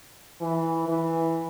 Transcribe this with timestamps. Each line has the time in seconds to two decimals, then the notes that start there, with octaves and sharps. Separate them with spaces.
0.41 E3
0.88 E3